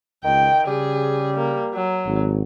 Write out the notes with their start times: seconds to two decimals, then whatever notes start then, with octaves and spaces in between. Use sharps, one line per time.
0.24 C#2 D#3 G5
0.67 C#3 G3 G#4
1.37 A#3
1.74 F#3
2.06 G#1